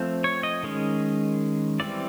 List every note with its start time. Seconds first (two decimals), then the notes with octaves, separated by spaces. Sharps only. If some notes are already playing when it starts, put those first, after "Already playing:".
Already playing: F3 A3 C4
0.24 C#5
0.43 D#5
0.63 D#3 G#3 C#4
1.80 E3 G3 C4 D5